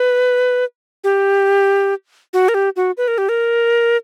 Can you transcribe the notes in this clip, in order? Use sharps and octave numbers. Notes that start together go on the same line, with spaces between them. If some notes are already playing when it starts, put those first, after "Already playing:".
Already playing: B4
G4
F#4
A#4
G4
F#4
B4
A#4
G4
A#4